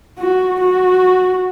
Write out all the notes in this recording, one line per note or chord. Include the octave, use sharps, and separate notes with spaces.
F#4
F#4